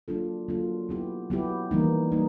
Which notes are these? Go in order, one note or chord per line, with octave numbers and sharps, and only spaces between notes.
F#3 A#3 D4 F4 A4
F#3 A#3 D4 F4 A4
F#3 B3 E4 G4
F#3 B3 E4 G4
E3 G3 A#3 D#4
G3 A#3 D#4